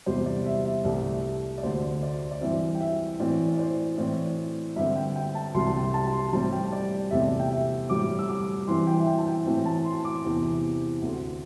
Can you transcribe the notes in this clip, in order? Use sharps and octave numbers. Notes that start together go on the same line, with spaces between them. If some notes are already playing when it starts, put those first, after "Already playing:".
E2 C3 G3 C5
D5
E5
E5
C2 C3 A3 D5
D5
D2 D3 A3 C5
D5
D5
G2 E3 C4 E5
G5
E5
A2 E3 C4 D5
D5
C5
A2 E3 C4 D5
G2 D3 C4 E5
G5
G5
A5
C2 C3 G3 C6
A5
G5
A5
A5
C6
A2 G3 C4 A5
G5
D5
E2 C3 A3 C4 E5
D5
E5
G5
E5
A2 G3 C4 D6
E6
D6
G2 E3 C4 C6
G5
E5
G5
A5
G5
A2 E3 C4
A5
C6
D6
E2 C3 E3 C4
D2 D3 C4